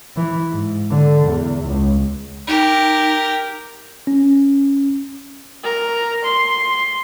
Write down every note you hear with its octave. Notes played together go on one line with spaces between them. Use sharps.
E3
G#2
D3
E2
C#2
D#4 G4 A#4
C#4
A#4
C6